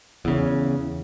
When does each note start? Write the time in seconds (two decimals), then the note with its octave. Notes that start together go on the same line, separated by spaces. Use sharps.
0.25 E2 C#3